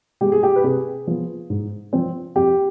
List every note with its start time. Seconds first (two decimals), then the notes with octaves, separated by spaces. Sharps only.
0.21 G#3 B3 G4
0.32 G#4
0.43 G4
0.56 B4
0.64 C3 G#4
1.07 F3 B3
1.50 G#2
1.93 F3 C4
2.36 F2 G4